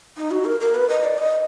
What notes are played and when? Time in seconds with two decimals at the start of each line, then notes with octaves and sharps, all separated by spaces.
0.17 D#4
0.31 F#4
0.45 A#4
0.61 A#4
0.75 B4
0.90 D#5
1.04 D5
1.18 D#5